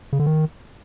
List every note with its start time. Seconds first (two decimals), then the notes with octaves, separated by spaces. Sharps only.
0.13 C#3
0.19 D3
0.26 D#3